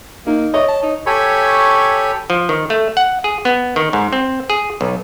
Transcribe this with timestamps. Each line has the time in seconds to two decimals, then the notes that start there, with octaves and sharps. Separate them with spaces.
0.27 A#3 D#4
0.54 C#5 D#5
0.68 A5
0.83 D#4
1.06 G4 A4 C#5 G#5 B5 C#6
2.30 F3
2.49 D#3
2.70 A3
2.97 F#5
3.24 G#4
3.45 B3
3.76 D#3
3.93 G#2
4.13 C4
4.50 G#4
4.81 B1